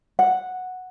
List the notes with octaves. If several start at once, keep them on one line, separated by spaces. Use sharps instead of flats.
F#5